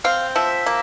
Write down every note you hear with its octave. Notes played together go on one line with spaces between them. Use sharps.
C4 F5
F3 E5
A#3